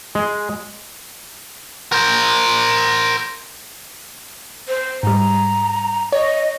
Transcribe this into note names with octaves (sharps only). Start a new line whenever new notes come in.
G#3
A#4 C5
C5
G#2 G3 A#5
C#5 D#5